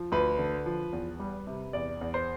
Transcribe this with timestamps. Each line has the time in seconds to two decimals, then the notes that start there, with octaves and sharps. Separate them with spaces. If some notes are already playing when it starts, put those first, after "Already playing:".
Already playing: F3
0.12 D2 B4
0.38 D3
0.66 F3
0.93 E2
1.20 G3
1.47 C3
1.73 E2 D5
2.01 E2
2.14 C5